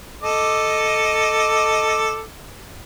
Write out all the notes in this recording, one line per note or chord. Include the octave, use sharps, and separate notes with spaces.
A4 D#5 D6